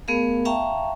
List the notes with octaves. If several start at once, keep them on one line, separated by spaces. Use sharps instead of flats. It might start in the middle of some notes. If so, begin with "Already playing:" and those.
A3 B3 G#4 A#4 F5
E5 F5 G5 A5 A#5 C#6